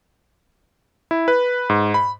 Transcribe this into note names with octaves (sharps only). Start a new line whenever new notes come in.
E4
B4
G#2
B5